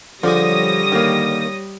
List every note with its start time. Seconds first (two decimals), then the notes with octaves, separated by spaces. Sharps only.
0.23 D3 F3 G3 G4 G#4 C#5 D#6 A#6
0.92 D#3 A#3